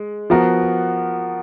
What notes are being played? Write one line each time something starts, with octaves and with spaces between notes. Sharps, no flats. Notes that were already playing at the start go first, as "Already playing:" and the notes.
Already playing: G#3
F3 B3 F#4 A#4